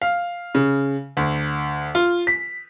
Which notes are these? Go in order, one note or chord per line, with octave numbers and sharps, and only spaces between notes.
F5
C#3
D2
F4
B6